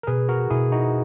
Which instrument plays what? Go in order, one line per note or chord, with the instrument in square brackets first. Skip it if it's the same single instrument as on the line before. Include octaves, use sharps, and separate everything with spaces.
[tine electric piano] A#4
[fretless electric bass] B2 [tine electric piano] G#4 B4
[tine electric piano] F#4 A#4
[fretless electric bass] B2 [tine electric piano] E4 G#4
[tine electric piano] D#4 F#4